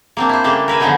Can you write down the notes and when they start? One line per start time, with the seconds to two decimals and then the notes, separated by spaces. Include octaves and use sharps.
0.17 A#3 C4 D4
0.29 E4 C5
0.44 C#3 G3 A3 A#3 D4
0.68 A#4 B4 E5 G#5
0.80 D3 F3 F#3 G#3 B3 D#4